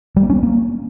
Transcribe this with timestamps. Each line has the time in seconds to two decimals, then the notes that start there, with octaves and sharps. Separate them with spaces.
0.16 G3
0.23 A#3
0.30 C#4
0.36 B3
0.43 A#3